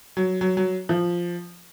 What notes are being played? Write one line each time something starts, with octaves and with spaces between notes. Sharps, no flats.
F#3
F#3
F#3
F3